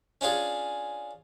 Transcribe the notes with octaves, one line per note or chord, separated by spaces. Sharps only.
C#4 D4 F4 G#4